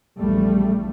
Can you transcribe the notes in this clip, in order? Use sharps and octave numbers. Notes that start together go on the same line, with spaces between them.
A#1 E2 G3 A3